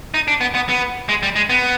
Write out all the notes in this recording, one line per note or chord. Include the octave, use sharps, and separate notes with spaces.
D#4
D4
B3
B3
B3
G#3
G3
G#3
B3